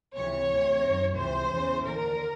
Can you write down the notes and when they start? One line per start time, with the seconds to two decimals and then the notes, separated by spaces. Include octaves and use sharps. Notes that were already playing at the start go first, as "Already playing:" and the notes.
0.14 C#2 C3 E3 C#5
0.49 D2 C3 E3
0.82 F#2 D#3
1.16 C#2 C3 E3 C5
1.50 E2 C#3 E3
1.84 D#2 D3 A#4